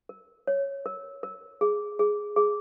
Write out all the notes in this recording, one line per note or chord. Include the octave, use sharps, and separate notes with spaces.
A#4
C#5
A#4
A#4
G#4
G#4
G#4